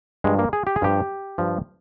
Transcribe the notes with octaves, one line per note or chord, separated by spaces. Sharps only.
G2 F3 G#3
A#3
G#4
G4
G#4
G2 F3 G4
G2 F3